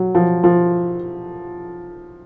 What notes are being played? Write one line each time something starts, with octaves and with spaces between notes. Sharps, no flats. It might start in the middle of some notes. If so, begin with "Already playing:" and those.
Already playing: F#3
F3
F3